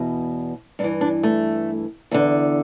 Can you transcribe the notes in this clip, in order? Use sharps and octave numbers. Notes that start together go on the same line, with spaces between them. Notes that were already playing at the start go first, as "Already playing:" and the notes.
Already playing: E2 B2
G2 E3 D4
D4
A3
E2 D3